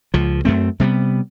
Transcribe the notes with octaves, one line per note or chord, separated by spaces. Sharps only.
C#2 F3
F#2 A3 C4
C3 G3 A3 B3